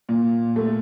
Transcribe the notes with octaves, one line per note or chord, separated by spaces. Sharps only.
A#2
A3